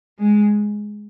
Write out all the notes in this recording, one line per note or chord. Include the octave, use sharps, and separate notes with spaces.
G#3